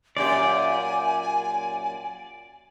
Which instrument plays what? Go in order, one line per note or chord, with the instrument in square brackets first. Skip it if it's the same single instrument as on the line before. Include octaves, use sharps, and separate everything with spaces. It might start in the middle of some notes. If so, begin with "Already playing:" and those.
[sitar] F#2 A#2 G4 [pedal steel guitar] D5 [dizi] G#5